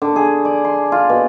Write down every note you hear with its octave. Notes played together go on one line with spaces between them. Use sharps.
D3
G#4
D5
C6
F4
B2